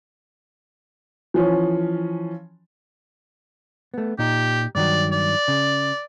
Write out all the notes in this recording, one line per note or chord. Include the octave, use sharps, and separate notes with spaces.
E3 F3 C#4
A3 B3
A#2 D#4 G4
G2 D#3 F#3 D5
D5
C#3